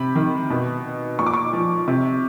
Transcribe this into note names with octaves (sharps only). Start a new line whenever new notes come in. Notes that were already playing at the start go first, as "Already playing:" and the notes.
Already playing: C3 B5
D#3
B2
A#2 C#6
D6
C#6
F3
C3